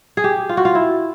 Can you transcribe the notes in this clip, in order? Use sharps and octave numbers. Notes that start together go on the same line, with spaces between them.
G#4
G4
F4
F#4
F4
E4